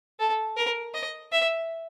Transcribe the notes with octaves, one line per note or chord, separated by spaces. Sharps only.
A4
A#4
D#5
E5